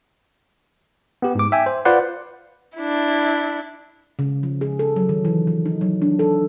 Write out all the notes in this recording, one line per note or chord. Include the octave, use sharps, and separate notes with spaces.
B3 G4
G#2 D6
E5 G5 G#5
C5
F4 B4 C5 D5 F#5 C6
D4 E4
C#3
F3
G#4
A4
F#3
D#3
E3
F3
D#4
F#3
D4
A4